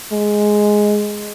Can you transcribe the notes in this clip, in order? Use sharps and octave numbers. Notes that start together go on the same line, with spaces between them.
G#3